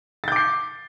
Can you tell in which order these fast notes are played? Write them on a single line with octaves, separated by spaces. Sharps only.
A6 G6 D6 C7